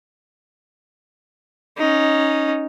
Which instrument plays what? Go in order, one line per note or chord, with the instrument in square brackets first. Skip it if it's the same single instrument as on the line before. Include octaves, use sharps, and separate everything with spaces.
[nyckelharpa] C#4 D#4